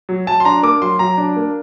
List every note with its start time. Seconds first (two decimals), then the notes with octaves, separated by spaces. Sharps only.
0.09 F#3
0.27 F#3 A5
0.40 C6
0.45 D4 A#5
0.63 A#3 D6
0.82 F#3 C6
0.99 F#3 A#5
1.18 D4
1.37 A#3